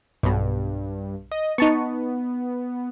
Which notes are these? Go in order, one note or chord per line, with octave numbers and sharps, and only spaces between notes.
B1 G2 B2
D#5
B3 D#4 A5 C#6